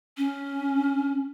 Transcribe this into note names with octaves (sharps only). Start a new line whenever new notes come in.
C#4